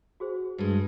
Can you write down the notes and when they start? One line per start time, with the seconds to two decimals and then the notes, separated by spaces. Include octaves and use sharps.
0.20 F#4 G#4 C5
0.58 G2 G#3